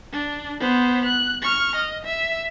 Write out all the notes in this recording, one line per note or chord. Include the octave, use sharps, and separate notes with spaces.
D4
B3 C5
F#6
C#6 F6
D#5
E5